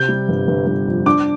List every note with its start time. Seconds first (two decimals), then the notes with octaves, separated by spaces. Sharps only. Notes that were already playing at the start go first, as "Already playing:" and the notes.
Already playing: C3 G6
0.08 G3
0.28 G1
0.47 G1
0.66 G1
0.87 F2
1.06 D4 D6